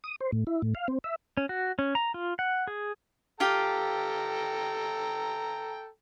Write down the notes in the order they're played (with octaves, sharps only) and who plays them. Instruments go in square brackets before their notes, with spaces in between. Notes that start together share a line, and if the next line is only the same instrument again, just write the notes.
[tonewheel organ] D#6
C5
A2
E4
A2
F5
C4
E5
[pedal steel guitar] C#4
F#4
C#4
A#5
F4
F#5
G#4
[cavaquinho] F4 G4 [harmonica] A4 G5 A#5